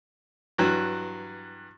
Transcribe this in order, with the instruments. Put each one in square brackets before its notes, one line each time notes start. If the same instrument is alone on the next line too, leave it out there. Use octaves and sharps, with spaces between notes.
[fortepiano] G2 E3 F#3